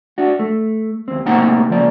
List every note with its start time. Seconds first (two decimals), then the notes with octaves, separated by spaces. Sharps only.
0.18 D4 F#4
0.39 A3
1.08 D#2 C4
1.26 C2 A2 A#3 C4 D#4 F#5
1.69 C#2 F3 A#3 D5